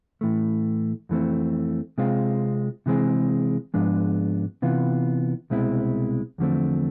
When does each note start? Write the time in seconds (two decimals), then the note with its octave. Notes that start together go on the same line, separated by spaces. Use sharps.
0.21 A2 E3 A3
1.09 F2 E3 A3 C4
1.98 C3 G#3 C4 F4
2.86 C3 E3 G#3 C4 G#4
3.74 G#2 F3 G#3 B3 D4
4.62 C3 E3 B3 F4
5.50 C2 B2 G#3 C4 E4
6.38 E2 D3 F3 A3 C4